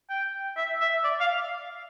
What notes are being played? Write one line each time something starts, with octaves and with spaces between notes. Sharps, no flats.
G5
E5
E5
D5
F5